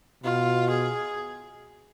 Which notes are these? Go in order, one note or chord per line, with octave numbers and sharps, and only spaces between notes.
B2 F4
G#4